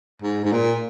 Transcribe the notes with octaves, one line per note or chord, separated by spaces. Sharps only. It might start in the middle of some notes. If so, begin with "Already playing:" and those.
G#2
G#2
A#2